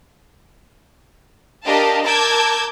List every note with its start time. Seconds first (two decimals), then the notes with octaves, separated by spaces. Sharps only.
1.65 D4 G4 A#4 D#5 F5 A5
2.04 A#4 A5 D6 E6 G6 G#6